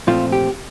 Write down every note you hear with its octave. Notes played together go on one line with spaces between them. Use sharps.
A#2 F3 A3 C4 F4
G4